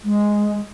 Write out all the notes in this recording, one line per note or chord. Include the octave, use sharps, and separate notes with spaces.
G#3